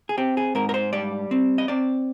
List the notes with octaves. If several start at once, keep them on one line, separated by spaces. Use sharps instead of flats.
G#4
C4 G4
G#4
G#2 A#4
A#4
C5
G3 D5
C4
D#5
C4 D5